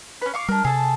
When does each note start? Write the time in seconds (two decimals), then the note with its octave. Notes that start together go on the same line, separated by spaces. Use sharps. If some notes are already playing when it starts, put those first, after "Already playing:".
0.21 C#4 B4
0.34 F5 C#6 D6
0.48 G3 D4 A#4
0.65 C3 G#4 A4 A5